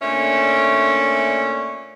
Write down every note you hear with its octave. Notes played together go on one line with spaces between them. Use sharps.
A#2 A3 C#4 D4 E5